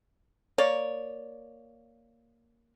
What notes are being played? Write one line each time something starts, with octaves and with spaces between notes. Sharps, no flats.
A#3 C#5 D5